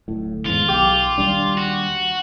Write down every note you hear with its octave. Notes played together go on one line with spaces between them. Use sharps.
D1 A2
E2 G#2 D#3 F4
B1 G4
D#2 G3 D4
F#4